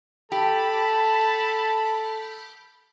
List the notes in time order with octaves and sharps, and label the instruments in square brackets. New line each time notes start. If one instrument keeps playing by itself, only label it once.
[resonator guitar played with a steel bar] G4 [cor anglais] A4 [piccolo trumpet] A5 [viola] B5